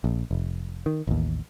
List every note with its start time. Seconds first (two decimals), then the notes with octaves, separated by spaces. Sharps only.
0.04 A#1
0.31 F1
0.86 D#3
1.07 A1 D#2